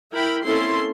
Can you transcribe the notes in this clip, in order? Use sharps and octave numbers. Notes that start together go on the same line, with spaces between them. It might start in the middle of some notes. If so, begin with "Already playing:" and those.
E4 A#4 G5 B5
A#3 C4 C#4 E4 A4 C6